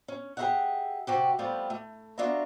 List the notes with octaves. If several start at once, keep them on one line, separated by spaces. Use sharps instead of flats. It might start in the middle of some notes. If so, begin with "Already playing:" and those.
C#4
G4 G#4 A#4 C#5 E5 F#5
C3 F#4 G4
G3 A3 B3 C4 F4
A3
B3 D4 F4 F#4 E5 A#5